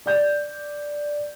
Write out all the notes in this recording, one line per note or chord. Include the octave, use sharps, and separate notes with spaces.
D5 G6